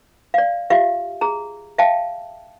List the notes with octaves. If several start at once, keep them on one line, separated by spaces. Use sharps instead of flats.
D5 F5
F4 G4 E5 F5
G#4 A#5
E5 F5 G5 A5